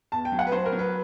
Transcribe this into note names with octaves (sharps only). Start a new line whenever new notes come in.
E2 A5
G5
F#3
F#5
B4
F#3 C5
A#4
F#3
B4